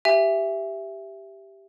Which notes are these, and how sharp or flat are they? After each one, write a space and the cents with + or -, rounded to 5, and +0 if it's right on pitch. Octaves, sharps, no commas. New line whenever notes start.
G4 +0 E5 +10 G#5 -25